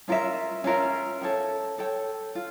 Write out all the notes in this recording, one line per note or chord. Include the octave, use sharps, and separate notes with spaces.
C#4 F4 A#4 E5
C#4 F4 A#4 E5
A4 C#5 G5
A4 C#5 G5
F4